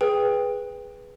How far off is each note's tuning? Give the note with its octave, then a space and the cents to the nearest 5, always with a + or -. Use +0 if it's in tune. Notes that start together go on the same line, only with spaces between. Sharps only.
G#4 +0 B4 +0 G5 +20